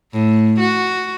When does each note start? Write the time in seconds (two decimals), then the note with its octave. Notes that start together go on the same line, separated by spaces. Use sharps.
0.13 A2
0.60 F#4